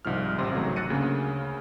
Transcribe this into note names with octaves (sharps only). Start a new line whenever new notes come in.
C2 G#2 F3 F6
A1 C3 C6
G#1 C#2 F#3 A3 A#5
E6 F#6 A6 A#6 C#7 D#7
D2 C#3 A#3